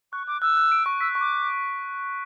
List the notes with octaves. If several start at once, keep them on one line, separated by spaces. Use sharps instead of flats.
C#6 F#6
D6 F#6
E6 F#6
F#6
D7
C#6
E6 B6
C#6
D6